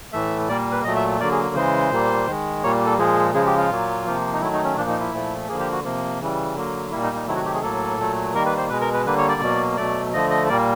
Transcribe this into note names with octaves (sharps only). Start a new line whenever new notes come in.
A2 E3 A3 E5
A#2 G3 A#3 D5
B4
A#2 F#3 A3 D#5
E5
D3 F#3 A#3 D5
G#4
C#3 E3 G#3 C5
A#2 G3 A#3
D#3 G#3
A#2 G3 A#3 C#5
A4
A#2 F3 G#3 G#4
C#3 F3 G#3 G#4
G4
F4
A#2 F#3 A#3
C3 F3 A#3
D#4
D#3 F#3 A3 E4
D#4
C#4
A#2 F3 A#3 D4
D#4
E4
A#2 F3 A3
D3 F3 A#3 G#4
G4
F#4
C3 F3 A#3
C#3 E3 G3
D3 F#3 A#3
A#2 G3 A#3 E4
D#4
D#4
C3 D#3 F#3 A3 E4
F#4
G4
G#4
A2 F#3 A#3 A4
A#2 F#3 A3
D#3 G3 A#3 A#4
B4
C5
B2 G#3 B4
A#4
B4
D3 G3 A#3 B4
C#5
D5
B2 F#3 A#3
B2 F#3 A3 D5
D3 F3 A3 D#5
D#5
A#2 G3 A#3 D5